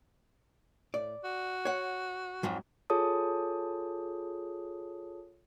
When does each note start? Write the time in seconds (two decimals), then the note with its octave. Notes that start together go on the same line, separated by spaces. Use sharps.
0.94 A2 D5
1.24 F#4
1.65 C#5 F#5
2.43 F2 G#2 F#3
2.90 F4 G#4 A4 C#5 A5 D#6